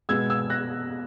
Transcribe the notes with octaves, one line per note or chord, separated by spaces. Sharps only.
B2 G#3 B3 E6 G#6
E6 G#6
F#6 A#6